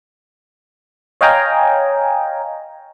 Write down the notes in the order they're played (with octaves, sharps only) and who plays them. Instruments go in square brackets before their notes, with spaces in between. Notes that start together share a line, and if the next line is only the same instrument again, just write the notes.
[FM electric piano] C#5 D#5 F5 G5 G#5 A#5